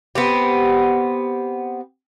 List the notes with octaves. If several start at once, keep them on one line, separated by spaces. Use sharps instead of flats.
B3 C4 G4